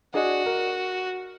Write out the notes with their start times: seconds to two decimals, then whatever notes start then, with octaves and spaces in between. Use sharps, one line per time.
0.14 D4 F#4 G#4 D#5
0.46 A#4